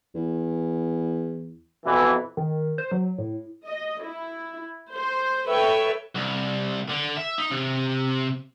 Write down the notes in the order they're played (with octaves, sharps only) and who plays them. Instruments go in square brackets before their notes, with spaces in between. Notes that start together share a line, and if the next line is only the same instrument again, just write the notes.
[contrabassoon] E2
[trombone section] F2 B2 E3
[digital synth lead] D#3
C5
F#3
A2
[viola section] D#5
E4
C5
A4 B4 C#5 E5 G5
[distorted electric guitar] C2
D3
E5
D#4
C3